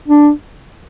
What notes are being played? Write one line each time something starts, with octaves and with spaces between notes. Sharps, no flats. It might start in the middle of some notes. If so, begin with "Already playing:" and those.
D4